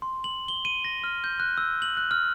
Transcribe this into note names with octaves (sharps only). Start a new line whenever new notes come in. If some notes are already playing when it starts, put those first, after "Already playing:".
C6
F#7
G7
D#7
A#6
F6
G6
F#6
E6
F#7
F#6
F6